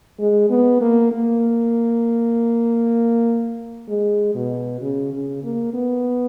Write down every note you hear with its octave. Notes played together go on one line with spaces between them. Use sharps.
G#3
B3
A#3
A#3
G#3
B2
C#3
C#3
A#3
B3